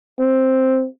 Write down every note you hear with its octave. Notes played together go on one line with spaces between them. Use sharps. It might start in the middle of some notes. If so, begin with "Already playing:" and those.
C4